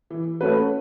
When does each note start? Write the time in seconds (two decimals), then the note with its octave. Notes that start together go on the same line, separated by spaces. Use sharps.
0.10 E3
0.41 A3 C#4 F#4 B4